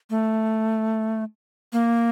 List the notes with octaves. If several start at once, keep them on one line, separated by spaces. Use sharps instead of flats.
A3
A#3